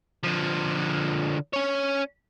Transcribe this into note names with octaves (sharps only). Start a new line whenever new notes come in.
D3 F3
C#4 C#5